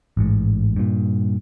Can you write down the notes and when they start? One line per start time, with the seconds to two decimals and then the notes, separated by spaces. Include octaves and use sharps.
0.17 A1 G#2
0.76 G2 A#2